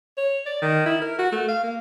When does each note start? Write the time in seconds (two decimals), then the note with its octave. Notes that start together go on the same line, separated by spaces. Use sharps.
0.17 C#5
0.46 D5
0.61 D#3
0.86 E4
1.01 A#4
1.19 F#4
1.32 A3
1.48 F5
1.63 A#3